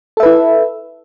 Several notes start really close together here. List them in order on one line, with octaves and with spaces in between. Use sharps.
A4 E5 B4 E4